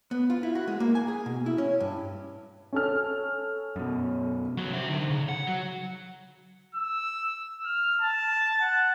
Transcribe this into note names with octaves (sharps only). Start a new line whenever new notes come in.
B3
F4
E4
F#4
G#3
A#3
G#5
G#4
B2
E4
C#4
G2
C#4 A4 F6
F#2 B2
C2 F#3
C5 E5
D3 D#4
C#3
F#5
F#3
E6
F6
A5
F#5